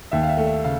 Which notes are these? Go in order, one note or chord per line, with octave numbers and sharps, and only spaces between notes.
D#2 E5
F5
E5
A3
E5
C#3 F5